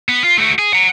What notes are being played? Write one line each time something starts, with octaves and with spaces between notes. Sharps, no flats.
B3
F4
A3 F#4
G#4
F#5 A#5